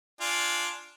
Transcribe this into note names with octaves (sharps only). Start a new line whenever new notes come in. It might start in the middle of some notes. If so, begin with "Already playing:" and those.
D4 F4 G#5